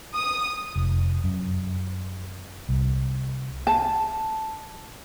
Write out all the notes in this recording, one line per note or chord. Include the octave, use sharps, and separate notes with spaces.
D#6
F1
F#2
C2
A5